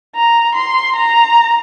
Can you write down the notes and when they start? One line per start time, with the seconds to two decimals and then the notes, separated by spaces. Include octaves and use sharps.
0.15 A#5
0.55 C6
0.96 A#5